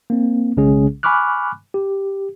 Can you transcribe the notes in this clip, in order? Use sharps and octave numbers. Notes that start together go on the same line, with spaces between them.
A#3 C4
B1 C#3 G#3 C#4 G#4
G#5 B5 C#6 D6 F6 F#6
G4